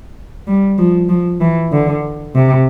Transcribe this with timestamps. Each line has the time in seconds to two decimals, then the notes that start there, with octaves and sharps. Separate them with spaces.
0.48 G3
0.78 F3
1.09 F3
1.41 E3
1.72 D3
2.35 C3